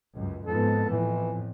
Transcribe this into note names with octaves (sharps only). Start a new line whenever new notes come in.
C#2 F#2
F2 G#2 B3 A4
F2 A2 E3